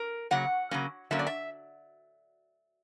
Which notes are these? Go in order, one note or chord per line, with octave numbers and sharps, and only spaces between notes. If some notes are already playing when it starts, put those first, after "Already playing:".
Already playing: A#4
C#3 F#3 A#3 F#5
C#3 F#3 A#3 C#4
D3 F#3 A#3 C#4 E5
D5
E5